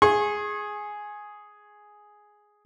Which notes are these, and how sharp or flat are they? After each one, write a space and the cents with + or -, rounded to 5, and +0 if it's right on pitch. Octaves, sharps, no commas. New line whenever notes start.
G#4 +0 C#6 -40